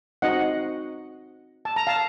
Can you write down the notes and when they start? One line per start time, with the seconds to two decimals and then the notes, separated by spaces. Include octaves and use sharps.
0.22 C4 D#4 F#4 D#5 F#5
1.65 A5
1.76 A#5
1.87 F5 A5